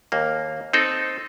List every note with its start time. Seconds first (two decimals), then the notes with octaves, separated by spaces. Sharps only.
0.12 D#2 A#3
0.73 C4 D#4 A4